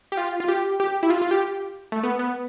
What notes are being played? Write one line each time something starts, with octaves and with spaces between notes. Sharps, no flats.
G4
F4
F4
G4
G4
E4
F4
F4
G4
A3
B3
B3